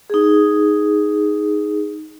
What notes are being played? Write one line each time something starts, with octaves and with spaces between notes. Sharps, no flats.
D#4 G#4